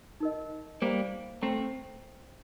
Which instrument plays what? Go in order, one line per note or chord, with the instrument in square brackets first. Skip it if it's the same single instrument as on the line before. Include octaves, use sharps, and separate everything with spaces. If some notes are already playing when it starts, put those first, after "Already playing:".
[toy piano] D#4 A#4 D#5
[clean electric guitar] G3 A#3 [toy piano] C5 F5 A#5
[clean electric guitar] A3 C4 [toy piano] C5 G5 A#5